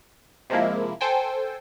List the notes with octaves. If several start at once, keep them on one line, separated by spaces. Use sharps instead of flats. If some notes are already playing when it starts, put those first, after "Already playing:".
C3 F3 G#3 A#3 E4
A4 C5 G5 G#5